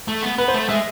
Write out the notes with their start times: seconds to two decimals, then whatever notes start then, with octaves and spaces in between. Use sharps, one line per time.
0.08 A3
0.23 B3
0.38 B3 B4
0.48 C5
0.54 A3
0.69 G#3 E5